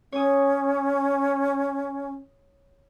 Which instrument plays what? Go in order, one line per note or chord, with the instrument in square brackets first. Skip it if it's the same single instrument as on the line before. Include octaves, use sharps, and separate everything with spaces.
[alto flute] C#4 [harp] C#5 D#6